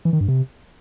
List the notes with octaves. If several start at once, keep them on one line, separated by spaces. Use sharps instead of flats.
E3
D#3
G2
C3